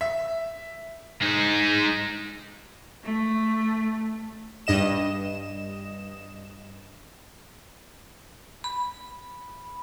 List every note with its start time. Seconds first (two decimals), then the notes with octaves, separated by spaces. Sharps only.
0.01 E5
1.22 G#3 D#4
3.04 A3
4.67 G2 D#5 E7
8.64 B5